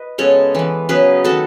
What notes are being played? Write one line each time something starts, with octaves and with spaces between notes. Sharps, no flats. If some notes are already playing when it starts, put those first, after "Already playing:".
Already playing: B4 D#5
C#3 G#3 B3 A4 C#5
E3 B3
C#3 F#3 B3 G#4 B4
D#3 A3 F#4 A4